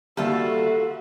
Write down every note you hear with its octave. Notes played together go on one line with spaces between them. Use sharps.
D#2 G3 F4 F#4 A4 E5